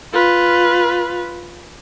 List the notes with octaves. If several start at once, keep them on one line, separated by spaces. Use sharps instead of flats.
F4 B4